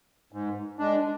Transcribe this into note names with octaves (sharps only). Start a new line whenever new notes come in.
G#2
G#3 D4